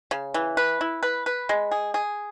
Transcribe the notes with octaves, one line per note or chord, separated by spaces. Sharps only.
C#3
E3
B4
E4
B4
B4
G#3
G#4
G#4